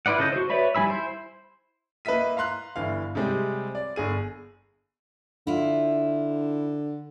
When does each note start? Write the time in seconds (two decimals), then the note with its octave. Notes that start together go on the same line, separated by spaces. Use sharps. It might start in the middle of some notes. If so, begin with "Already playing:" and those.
0.06 E4 F4 B4 D5 F#5
0.19 C#3 A4 D#5 G6
0.32 F#4 C5
0.50 B4 C#5 D5 E5 B5
0.75 G3 F4 G#5 B5 E6
0.87 E4 C5
2.05 A#3 B4 D#5 E5 B6 D#7
2.37 F5 A#5 C6 F#6
2.76 G1 E3 F5
3.15 C3 G3 G#3 C4
3.75 D5
3.96 G1 G#4 D#7
5.47 D3 E4 F4